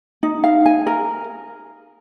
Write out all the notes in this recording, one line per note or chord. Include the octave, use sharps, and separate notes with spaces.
D#4
F5
G#5
A#4